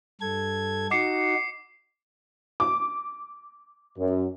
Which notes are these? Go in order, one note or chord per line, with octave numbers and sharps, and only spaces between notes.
G2 A4 G#6
D#4 F#4 D6 C7 C#7
D6
F#2